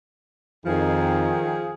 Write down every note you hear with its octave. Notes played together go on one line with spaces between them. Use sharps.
F2 D#3 F3 G#4